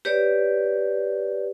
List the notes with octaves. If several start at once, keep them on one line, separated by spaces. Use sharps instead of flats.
G4 B4 C#5 D5